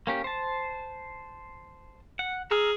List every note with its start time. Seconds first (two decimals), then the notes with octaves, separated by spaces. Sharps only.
0.07 A#3 C#4 G4
0.24 C5 A5
2.19 F#5
2.51 G#4 A#5 E6 F6